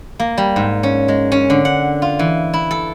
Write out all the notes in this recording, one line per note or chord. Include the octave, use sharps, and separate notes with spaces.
A#3
G3
G#2
C#4
G#3
C#4
D3
F#5
F4
E3
E4
A4